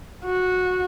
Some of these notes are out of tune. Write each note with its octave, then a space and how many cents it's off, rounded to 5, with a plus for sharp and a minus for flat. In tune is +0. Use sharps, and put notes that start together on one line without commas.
F#4 -15